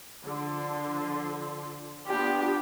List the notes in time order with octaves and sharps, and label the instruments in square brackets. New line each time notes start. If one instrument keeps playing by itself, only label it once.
[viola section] D3 F3 C6
[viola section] B3 D4 F4 [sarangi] G4